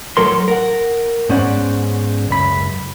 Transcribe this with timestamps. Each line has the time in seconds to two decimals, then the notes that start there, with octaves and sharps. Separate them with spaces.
0.17 A2 F#3 A4 A#4 C6
0.48 A#4 F#5
1.29 G#2 B3 C#4 C5 D5 F#5
2.29 C#2 F#2 B5